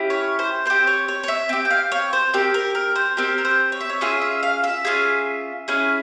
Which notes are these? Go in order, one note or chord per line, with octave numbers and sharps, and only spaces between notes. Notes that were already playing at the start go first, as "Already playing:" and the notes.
Already playing: C#4 E4 G4
C#5
C5
C4 G4 C5
C#5
C#5
C#5
E5
C4 G4
G5
F5
C#5
C5
C4 G4 A#4
A#4
A#4
C5
C4 G4 A#4
A#4
C5
C#5
E5
C#5
C#4 F4 G#4 E5
E5
F5
E5
C#4 F4 G#4
C#4 E4 G#4